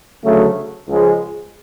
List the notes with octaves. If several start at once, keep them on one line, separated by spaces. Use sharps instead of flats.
D2 C#3 F#3 A3
C#2 C#3 F3 G#3